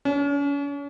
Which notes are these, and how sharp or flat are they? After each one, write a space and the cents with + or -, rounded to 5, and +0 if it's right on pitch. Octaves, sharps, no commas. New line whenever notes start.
C#4 +40